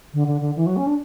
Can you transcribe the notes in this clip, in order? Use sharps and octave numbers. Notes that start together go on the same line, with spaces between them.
D3
D3
D3
E3
F#3
C#4
D4